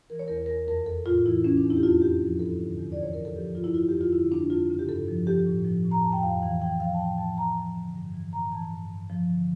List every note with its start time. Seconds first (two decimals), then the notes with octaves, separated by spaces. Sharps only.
0.10 E3 A#4
0.19 C#5
0.28 E2 A#4
0.37 C#5
0.46 A#4
0.49 E2
0.68 F2 A#4
0.86 F2 A4
1.06 A2 F4
1.25 E3 E4
1.44 E3 C#4
1.57 D4
1.63 E2
1.70 E4
1.77 G4
1.83 F2 F4
2.02 F2 G4
2.21 F3
2.39 G2 A4
2.59 D3
2.78 E2
2.92 E3 D5
3.03 C#5
3.13 F2 A#4
3.25 A4
3.36 F3 G4
3.55 G2 F4
3.64 E4
3.74 F2 F4
3.88 F2 G4
4.01 F4
4.13 D3 E4
4.32 F2 D4
4.50 F2 F4
4.70 C#3
4.79 G4
4.88 G2 A4
5.09 F3
5.27 F3 G4
5.46 A2
5.65 F3
5.85 A2
5.91 A#5
6.01 F2 A5
6.13 G5
6.23 F2 F5
6.42 E3 F5
6.61 E3 G5
6.80 F3 F5
6.94 A5
6.99 A2 G5
7.18 F3 A5
7.38 A2 A#5
7.57 F3
7.76 D3
7.95 G2
8.14 E3
8.33 A2 A#5
8.52 E3 A5
8.71 G2
8.91 G2
9.10 F3
9.30 D3